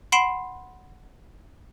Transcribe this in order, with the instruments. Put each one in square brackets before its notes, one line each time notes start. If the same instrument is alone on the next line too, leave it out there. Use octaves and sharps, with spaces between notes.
[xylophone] F#5 B5 C6 C7 D7 E7